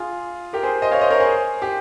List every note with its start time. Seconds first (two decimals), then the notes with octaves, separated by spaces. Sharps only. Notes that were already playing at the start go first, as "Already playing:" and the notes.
Already playing: F4 G#4
0.53 G4 A#4
0.63 G#4 C5
0.82 C5 D#5
0.91 C#5 F5
1.01 C5 D#5
1.10 A#4 C#5
1.20 G#4 C5
1.62 G4